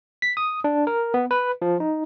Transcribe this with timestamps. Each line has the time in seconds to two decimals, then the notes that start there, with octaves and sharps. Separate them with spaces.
0.22 B6
0.37 D#6
0.64 D4
0.87 A#4
1.14 B3
1.31 B4
1.62 F3
1.80 D#4